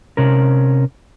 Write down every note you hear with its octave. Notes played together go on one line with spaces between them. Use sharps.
C3 C#4 A#4